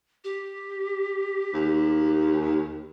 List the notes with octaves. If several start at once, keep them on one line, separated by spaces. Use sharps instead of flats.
G4
D#2